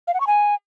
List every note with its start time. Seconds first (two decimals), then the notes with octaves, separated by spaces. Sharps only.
0.08 F5
0.14 F#5
0.20 C#6
0.27 G#5